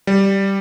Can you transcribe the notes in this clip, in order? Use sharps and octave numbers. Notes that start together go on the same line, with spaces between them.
G3